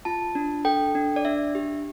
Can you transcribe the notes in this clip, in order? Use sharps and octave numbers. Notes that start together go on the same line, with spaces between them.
F4 A5
D4
A4 G5
D4
D5
D4 E5
G4